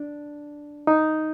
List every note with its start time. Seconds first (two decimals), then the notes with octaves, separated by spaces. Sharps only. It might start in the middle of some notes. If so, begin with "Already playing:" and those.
Already playing: D4
0.87 D#4